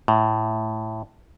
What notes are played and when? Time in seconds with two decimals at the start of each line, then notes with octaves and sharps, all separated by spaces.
0.08 A2